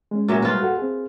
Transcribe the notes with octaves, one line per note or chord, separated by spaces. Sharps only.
G#3 C#4
A#2 F#3 E5
G#2 G3 F4 B4
F#4 A4 F#5
C4 G#4